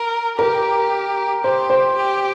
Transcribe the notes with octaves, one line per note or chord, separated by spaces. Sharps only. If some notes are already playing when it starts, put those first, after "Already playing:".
Already playing: A#4
G4 A#4
G4 C5
C5
G4